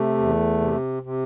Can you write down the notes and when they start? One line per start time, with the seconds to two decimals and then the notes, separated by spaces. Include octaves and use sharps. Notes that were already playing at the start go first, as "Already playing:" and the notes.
Already playing: C3 A3
0.18 E2
0.60 C3
1.03 C3